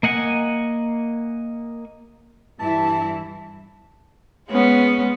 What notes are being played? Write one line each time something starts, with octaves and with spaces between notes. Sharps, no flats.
A#3 D#5 F#5 G#5
G2 E3 E4 A5
G#3 B3 C#4